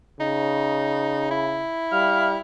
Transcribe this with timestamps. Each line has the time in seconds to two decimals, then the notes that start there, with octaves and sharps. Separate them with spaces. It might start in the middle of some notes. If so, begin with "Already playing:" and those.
0.20 C#3 D#4
1.31 E4
1.92 G3 F5